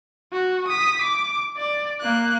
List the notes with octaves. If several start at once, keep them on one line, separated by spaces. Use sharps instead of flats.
F#4
D#6 B6
D6
D5
A#3 F#6